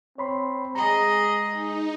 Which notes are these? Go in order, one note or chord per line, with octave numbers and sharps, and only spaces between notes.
C4 C#5 B5 C6
G#3 G#4 D#5 A#5
D#4